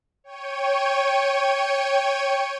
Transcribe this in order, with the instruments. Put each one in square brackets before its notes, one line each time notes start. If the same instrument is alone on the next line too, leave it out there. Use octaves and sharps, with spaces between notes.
[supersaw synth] C#5 G5 C#6 D#7